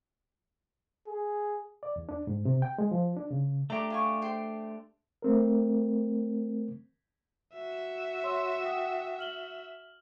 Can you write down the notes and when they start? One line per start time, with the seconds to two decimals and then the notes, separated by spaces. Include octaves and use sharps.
1.07 G#4
1.83 D5
1.96 E2
2.09 D4
2.27 G#2
2.45 C3
2.62 G5
2.78 G#3
2.91 F3
3.16 D4
3.31 C#3
3.70 A3 D4 G4 A#5 C6 D6
3.90 F4 G#5 C#6
4.22 C5 G5 C6
5.22 A3 C4 A#4
7.54 F#4 E5
8.24 C#5 C6 E6
8.64 F#5 G5 D#6
9.19 F6 F#7 G7